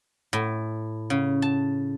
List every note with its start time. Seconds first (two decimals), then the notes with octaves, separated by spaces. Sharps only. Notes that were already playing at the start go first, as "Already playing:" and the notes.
0.33 A2
1.10 C#3
1.42 A5